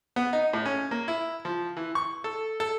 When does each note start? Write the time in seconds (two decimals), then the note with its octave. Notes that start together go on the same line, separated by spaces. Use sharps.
0.16 B3
0.33 D#4
0.53 A2
0.65 C#4
0.91 A#3
1.08 E4
1.45 F3
1.77 E3
1.95 C#6
2.24 A4
2.60 A4